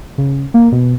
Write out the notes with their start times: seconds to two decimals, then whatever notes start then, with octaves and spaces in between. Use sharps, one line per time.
0.18 C#3
0.54 A#3
0.72 B2